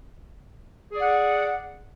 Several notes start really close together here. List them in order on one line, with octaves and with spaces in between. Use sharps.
G#4 D5 F#5